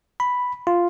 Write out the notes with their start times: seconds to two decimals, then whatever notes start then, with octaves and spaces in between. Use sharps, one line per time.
0.20 B5
0.67 F4